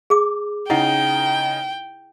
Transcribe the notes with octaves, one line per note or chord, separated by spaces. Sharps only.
G#4 D6
C#3 D#4 E4 F#5 G5